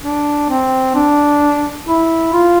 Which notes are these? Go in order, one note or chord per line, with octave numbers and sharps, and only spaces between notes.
D4
C4
D4
E4
F4